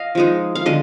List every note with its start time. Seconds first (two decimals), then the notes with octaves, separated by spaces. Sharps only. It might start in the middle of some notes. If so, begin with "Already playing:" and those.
Already playing: D#5 F5
0.15 F3 G#3 D#4
0.55 F5
0.66 D3 G#3 D#5